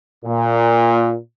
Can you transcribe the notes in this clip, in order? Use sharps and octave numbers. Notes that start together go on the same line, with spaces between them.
A#2